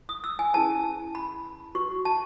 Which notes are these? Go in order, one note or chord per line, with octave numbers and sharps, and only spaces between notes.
D#6
E6
G#5
C#4 E4 G#4 B4 A5
B5
F#4 B4 C#6
A5